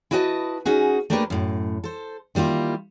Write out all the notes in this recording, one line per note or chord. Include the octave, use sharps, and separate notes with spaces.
E4 F#4 B4 D#5 G5 A5
C#4 D#4 F#4 G#4
A3 A#3 D4 G4 A#4 B4
F#2 A2
A4 C5
D#3 G3 A#3 E4 F4